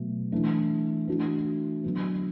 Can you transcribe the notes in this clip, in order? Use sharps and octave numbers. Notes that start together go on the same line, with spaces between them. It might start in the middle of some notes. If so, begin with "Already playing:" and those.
Already playing: B2 F#3 A3
E3 A3 D4
E3 A3 D4 F#4
D3 F#3 B3